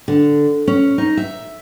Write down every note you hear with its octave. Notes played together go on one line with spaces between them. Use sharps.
D3
C#4
D#4
E5